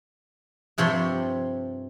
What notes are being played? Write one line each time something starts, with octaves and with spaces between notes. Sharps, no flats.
G2 C3 F3 C#5 B5 C6